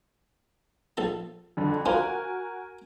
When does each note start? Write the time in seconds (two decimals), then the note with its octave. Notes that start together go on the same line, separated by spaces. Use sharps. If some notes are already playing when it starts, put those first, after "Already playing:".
0.97 A#1 A4 A5
1.57 F2 D3
1.86 D4 F4 F#4 A#4 C5 G#5